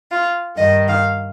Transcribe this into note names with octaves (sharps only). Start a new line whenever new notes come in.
F4
G2 D#3 D#5
F5